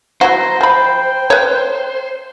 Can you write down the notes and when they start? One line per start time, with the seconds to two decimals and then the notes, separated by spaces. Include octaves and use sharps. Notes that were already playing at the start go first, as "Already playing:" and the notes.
0.21 F#3 E4 F#4 C5 A#5
0.61 F3 G5 B5
1.30 B4 C#5